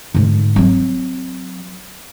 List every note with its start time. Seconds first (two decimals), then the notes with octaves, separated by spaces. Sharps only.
0.15 G#2 D3
0.56 F#3 C4